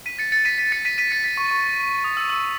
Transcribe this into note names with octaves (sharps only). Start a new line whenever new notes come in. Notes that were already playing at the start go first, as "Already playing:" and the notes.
B6 D#7
A6 C#7
A6 C#7
B6 D#7
B6 D#7
A6 C#7
B6 D#7
B6 D#7
A6 C#7
B6
C#6
C#6
D#6
E6
E6